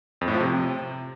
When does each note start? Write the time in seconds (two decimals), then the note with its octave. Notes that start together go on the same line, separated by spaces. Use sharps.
0.21 F2
0.28 A2
0.34 F3
0.40 C3